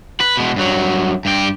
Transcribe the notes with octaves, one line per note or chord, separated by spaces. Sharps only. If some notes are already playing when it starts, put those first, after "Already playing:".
B4
B2 G#3
G2 F#3
G2 G4